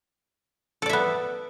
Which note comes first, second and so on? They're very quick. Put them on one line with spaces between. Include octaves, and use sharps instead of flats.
A4 D5 E5 B3